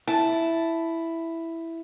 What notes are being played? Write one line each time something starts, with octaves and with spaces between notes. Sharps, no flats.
E4 A5